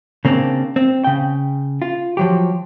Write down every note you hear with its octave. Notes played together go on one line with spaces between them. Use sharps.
C#3 A#3 C4 D4
C4
C#3 G5
F4
F3 F#3 G4